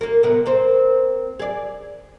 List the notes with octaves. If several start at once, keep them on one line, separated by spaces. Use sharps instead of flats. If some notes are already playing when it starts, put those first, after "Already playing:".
A#3 A#4
C3 B3 A#4
A#3 C4 C5
G#4 D5